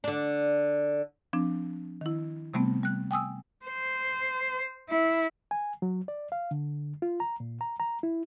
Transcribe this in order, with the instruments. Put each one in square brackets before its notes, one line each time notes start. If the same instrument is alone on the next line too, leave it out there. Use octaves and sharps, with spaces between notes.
[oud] D3 D4
[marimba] F3 C4 D4
D#3 E4
C3 G3 A3 B3 C4
G3 F#6
G5 G#5 D#6 E6
[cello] C5
E4
[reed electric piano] G#5
F#3
D5
F5
D3
F4
A#5
A#2
A#5
A#5
E4